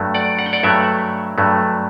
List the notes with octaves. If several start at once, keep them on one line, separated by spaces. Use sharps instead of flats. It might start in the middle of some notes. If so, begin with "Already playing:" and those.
Already playing: G2 F#3 A3
D5 F#5
F#5
G5
D5 F#5
G2 F#3 A3 C#5 E5
G2 F#3 A3